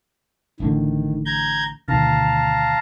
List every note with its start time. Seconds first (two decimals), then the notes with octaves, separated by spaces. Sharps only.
0.60 A1 A2 D3 D#3
1.26 A#5 G6 G#6
1.88 D2 B2 D#3 F5 A5 A#5